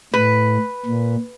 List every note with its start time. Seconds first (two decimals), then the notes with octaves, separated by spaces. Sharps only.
0.14 A2 B4
0.85 A#2